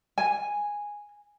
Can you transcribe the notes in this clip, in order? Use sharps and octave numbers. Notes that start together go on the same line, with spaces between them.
G#5